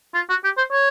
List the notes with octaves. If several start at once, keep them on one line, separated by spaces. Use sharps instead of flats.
F4
F#4
G4
C5
C#5